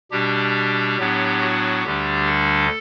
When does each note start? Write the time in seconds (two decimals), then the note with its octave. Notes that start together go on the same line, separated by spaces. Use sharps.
0.11 B2 G3 D4 G4
0.97 A2 F#3 B3 D4
1.41 F#4
1.84 D2 D3 G3 D4 G4
2.27 A4